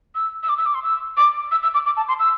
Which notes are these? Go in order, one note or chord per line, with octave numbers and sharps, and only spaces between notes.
E6
E6
D6
E6
D6
C6
E6
D6
E6
E6
D6
D6
A5
C6
E6